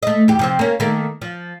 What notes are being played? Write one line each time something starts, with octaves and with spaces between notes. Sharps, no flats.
A3 D#5
E2 G4
C3 F3 C4
A#3 C#4
D#3 A3 A#3
F3